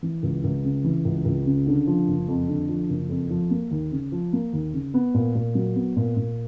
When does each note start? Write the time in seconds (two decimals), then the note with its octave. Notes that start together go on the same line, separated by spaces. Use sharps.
0.03 E3
0.23 C#2
0.44 C#2
0.64 C#3
0.84 E3
1.05 C#2
1.25 C#2
1.46 C#3
1.67 D3
1.87 F3
2.08 F#1
2.28 F2
2.48 D3
2.69 F3
2.89 F#1
3.10 F2
3.30 F3
3.51 A#3
3.71 D#2
3.92 C#3
4.12 F3
4.33 A#3
4.53 D#2
4.74 C#3
4.94 B3
5.14 A#2
5.35 A#2
5.55 F#3
5.76 B3
5.96 A#2
6.16 A#2